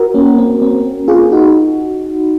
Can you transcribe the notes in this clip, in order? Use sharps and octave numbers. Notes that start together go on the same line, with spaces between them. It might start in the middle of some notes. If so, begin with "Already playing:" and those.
Already playing: F#4 A#4
A#3 C#4
C4
C4
F4 G#4
D#4 F#4